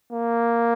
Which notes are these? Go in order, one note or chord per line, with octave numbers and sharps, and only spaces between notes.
A#3